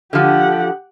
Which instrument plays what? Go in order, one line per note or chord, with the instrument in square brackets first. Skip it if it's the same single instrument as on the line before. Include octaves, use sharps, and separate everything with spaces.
[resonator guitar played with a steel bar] D3 F3 [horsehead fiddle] G4 F#5